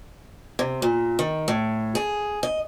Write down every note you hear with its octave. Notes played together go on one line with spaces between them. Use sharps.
C3
A#2
D#3
A2
G#4
D#5